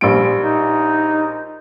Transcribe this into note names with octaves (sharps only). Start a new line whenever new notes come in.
A#1 G3 D7
D#4